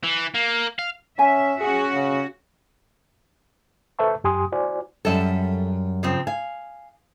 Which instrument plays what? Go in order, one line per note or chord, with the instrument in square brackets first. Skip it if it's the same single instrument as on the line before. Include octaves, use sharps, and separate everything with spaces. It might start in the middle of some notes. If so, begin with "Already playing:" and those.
[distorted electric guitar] E3
A#3
F5
[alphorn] C#4 [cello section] E5 [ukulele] G#5
[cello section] C#4 F#4 [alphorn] G#4
[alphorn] C#3
[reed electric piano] A4 B4 C5 E5 A5 C#6
F#2 G4 G#5 C6 D#6
E4 F#4 C5 D5 G#5
[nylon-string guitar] F#2 G3 [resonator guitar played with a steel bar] A4 E5
[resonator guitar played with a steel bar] C#3 F3 C4
[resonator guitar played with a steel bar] F5 [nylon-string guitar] G#5